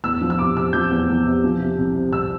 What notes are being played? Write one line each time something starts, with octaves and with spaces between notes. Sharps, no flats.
E2 E6
F3
E6
C3 D6
C3 E6
F3 G6
E2
E2
C3
F3
C3
C2
C3
C2 E6